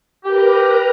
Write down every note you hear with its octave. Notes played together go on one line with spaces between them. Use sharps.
G4 A#4 B4 A#5